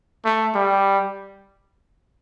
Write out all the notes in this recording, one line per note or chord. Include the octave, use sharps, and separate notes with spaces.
A3
G3